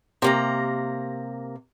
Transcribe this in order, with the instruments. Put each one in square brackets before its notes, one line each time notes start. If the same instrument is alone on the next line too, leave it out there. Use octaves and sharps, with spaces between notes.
[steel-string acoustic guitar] C3 A#3 A#5